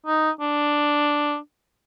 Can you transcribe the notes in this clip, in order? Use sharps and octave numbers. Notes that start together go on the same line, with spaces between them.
D#4
D4